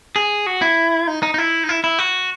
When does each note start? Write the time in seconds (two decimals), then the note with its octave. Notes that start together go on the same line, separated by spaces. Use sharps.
0.16 G#4
0.46 F#4
0.62 E4
1.07 D#4
1.23 D#4
1.34 D#4
1.38 E4
1.64 D#4
1.69 E4
1.84 E4
1.99 F#4